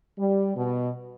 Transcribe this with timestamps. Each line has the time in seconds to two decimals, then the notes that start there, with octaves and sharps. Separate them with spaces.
0.18 G3
0.56 B2